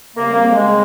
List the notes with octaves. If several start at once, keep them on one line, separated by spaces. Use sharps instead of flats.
C#3 G3 A#3 C4
A#3
G#3